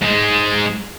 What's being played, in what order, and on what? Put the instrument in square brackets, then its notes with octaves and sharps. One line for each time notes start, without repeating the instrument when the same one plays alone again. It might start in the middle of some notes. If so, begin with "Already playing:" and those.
[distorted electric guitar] G#2 G#3